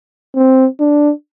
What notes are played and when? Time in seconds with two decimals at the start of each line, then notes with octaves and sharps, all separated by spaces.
0.36 C4
0.80 D4